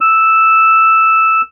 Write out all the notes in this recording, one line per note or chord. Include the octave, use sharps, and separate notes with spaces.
E6